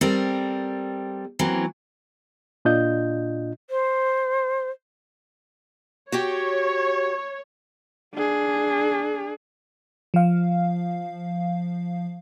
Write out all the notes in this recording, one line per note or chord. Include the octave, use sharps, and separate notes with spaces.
G3 C4 A4 A#4
E3 F#3 A#3 C4
A#2 D4 F4 D#5 G6
C5
F#4 G4 C#5 G5
D4 G#4
F3 F5